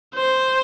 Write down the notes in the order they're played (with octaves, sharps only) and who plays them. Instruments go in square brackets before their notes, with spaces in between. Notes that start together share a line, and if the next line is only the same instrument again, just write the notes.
[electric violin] C5